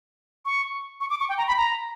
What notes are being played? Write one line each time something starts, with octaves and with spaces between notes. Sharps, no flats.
C#6
C#6
D6
C#6
G5
A#5
B5
A#5